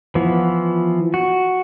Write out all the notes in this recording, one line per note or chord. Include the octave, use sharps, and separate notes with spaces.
E3 F3 B3
F#4